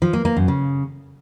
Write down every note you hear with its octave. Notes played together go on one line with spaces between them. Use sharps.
F3
A#3
A#3
F#2
C#3